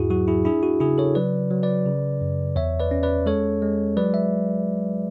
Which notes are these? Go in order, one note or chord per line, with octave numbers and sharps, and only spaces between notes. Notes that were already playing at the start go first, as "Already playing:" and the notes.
Already playing: E2 G#2 E4 F#4 G#4
F#3 F#4
E4 G#4
D4 E4 G#4
F#4
C#3 E4 G#4
A4 C#5
F#3 B4 D5
F#3
B4 D5
C#3
F#2
E2 C#5 E5
B4 D5
C#4
B4 D5
G#3 A4 C#5
G#3
F#3 B4 D5
E5